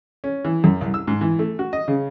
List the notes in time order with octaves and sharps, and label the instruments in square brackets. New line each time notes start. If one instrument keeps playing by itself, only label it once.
[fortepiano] C#4
E3
F#2
C2
E6
G#2
E3
A3
F#4
D#5
C#3